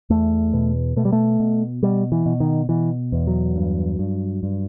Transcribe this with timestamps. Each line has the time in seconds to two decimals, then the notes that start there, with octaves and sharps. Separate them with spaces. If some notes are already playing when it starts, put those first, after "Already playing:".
0.10 E2 A3
0.53 B2
0.96 B2 A3
1.05 G3
1.12 A3
1.40 B2
1.83 B2 G3
2.12 E3
2.26 B2
2.40 D#3
2.69 B2 E3
3.12 E2
3.27 F#3
3.56 G2
3.99 G2
4.43 G2